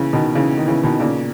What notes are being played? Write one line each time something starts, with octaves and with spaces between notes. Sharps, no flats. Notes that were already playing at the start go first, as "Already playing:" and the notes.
Already playing: C#3 E3
B2 D#3
C#3 E3
D#3
C#3 E3
B2 D#3
A#2 C#3